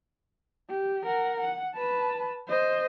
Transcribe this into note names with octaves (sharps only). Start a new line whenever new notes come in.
G4
A#4 F#5
F#5
B4 A5
C5 D#5